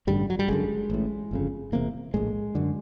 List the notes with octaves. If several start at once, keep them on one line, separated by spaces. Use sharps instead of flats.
A1 G2 D3 G3
F#3
G3
F#1 F#2 D3 G#3
A1 A2
G1 F2 C#3
E1 E2 C3 A#3
A#1 A2 G#3
F#2 D3